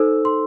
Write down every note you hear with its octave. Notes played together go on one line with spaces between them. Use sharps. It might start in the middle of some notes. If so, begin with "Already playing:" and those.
Already playing: D#4 A4 C5 E6
C6